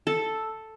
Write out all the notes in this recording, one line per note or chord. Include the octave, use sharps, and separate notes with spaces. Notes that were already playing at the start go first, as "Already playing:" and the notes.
A4